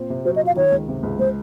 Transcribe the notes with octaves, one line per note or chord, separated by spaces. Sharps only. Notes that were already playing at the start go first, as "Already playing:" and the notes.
Already playing: A#2 C4
C3
F#3 C5
D#5
F4
F5
D#3 C#5
C#2
C3
C#2
G#3 C5